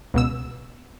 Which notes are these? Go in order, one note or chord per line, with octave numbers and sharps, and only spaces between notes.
C#2 B2 E6